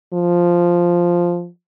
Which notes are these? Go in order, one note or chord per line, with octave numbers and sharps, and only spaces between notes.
F3